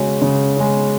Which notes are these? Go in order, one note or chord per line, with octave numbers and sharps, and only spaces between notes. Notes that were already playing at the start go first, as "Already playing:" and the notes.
Already playing: C#3 G#3 C#4 F#4
C#3
G#3 C#4